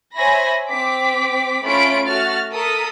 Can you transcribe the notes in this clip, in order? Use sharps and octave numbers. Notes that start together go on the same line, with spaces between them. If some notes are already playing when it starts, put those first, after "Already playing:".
C5 C#5 E5 G#5 B5 A#6
C4 D6 B6
A3 C#4 F4 B5 B6 D7
A3 F#4 F6 A6
A4 A#4 D#6 B6